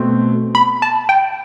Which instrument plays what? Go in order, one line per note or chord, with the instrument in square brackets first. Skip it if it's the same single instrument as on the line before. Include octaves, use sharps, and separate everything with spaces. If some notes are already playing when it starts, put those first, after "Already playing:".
Already playing: [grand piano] B2 A3 C4
[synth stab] B5
A5
G5